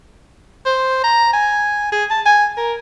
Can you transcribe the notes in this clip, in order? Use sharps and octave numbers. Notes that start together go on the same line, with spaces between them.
C5
A#5
G#5
G#4
A5
G#5
A#4